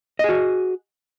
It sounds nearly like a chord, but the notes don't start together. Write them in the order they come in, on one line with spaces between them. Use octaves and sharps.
D#5 G#4 F#4